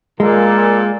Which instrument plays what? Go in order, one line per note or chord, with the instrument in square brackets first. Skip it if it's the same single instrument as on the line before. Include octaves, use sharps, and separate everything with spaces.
[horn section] A#2 A#3 A4 [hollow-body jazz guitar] G#3